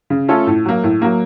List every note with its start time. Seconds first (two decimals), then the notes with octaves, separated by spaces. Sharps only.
0.10 C#3
0.28 A3 C#4 F4 A4
0.47 A2
0.65 F#3 A#3
0.83 A2
1.02 F#3 A#3